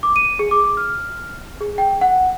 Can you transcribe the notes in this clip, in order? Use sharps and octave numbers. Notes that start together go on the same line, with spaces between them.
D6
D#7
G#4
D6
F6
G#4
G5
F#5